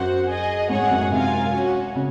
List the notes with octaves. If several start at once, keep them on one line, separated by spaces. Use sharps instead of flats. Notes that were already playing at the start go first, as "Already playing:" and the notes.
Already playing: F#2 F#4 C5 F#5
G#4 D#5 G#5
G#2 G#4 C#5 F#5
G#2
F#2
G#2
C3 F4 A#4 F5 G#5
C#4 F#4 C#5
C#3